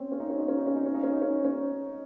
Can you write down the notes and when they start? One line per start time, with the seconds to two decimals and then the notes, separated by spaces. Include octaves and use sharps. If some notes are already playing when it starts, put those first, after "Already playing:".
Already playing: C4 C#4
0.12 C#4
0.20 D#4
0.30 C#4
0.40 D#4
0.48 C#4
0.57 D#4
0.67 C#4
0.76 D#4
0.86 C#4
0.94 D#4
1.03 C#4
1.14 D#4
1.22 C#4
1.45 C#4